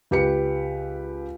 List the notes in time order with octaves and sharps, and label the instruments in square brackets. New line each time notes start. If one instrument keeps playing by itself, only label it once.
[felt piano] C#2 G4 B4 C#7